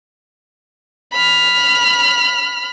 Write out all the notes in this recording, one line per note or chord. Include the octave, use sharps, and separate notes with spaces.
B5 F6